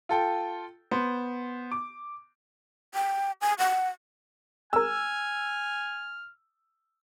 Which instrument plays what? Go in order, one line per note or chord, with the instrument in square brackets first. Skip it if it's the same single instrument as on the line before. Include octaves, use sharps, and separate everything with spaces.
[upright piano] F4 A4 G5
B3 C5
D6
[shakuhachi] G5
G#5
F#5
[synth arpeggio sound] G#4 A#4 [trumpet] G#5 [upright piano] E6 [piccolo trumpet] F6